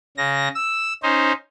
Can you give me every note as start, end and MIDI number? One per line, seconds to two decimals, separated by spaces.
0.17 0.48 49
0.17 0.48 94
0.55 0.93 88
1.03 1.32 61
1.03 1.32 63
1.03 1.32 72